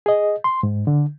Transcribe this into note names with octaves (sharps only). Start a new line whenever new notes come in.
G#4 D#5
C6
G#2
D3